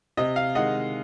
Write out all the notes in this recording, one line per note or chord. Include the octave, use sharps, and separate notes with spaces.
C3 D#5
F5
D#3 G#3 D#5 F#5